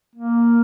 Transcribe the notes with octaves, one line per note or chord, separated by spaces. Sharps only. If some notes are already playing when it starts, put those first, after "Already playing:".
A#3